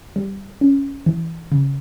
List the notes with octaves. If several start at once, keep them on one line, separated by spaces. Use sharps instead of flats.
G3
C#4
E3
C#3